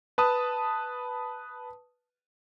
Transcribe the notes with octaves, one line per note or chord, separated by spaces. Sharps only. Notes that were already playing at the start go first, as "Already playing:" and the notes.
B4 A5 D#6